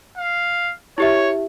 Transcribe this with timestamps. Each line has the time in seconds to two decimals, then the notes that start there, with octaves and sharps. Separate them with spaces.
0.17 F5
0.98 E4 G4 C#5 E5